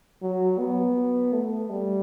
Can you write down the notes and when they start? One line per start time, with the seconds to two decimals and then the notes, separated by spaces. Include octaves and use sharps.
0.22 F#3
0.58 B3
1.33 A3
1.70 G3